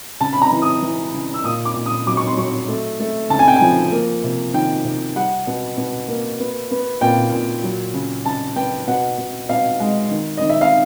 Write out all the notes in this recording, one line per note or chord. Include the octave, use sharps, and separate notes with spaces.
C#3 A5
B5
A#5
E3
D#6
E3
C#3
E6
A#2 D#6
D6
A#2
D#6
F#3 D6
C#6
C6
F#3 C#6
A3
A3
C#3 A5
G#5
G5
F3 G#5
A#3
C3
D#3 G5
C3
G3 F#5
B2
B2
A#3
B3
B3
A#2 G5
A#2
F#3
C#3
C#3 A5
B3 G5
B2 F#5
B2
B2 F5
G#3
D#3
D#3 D#5
E5
F5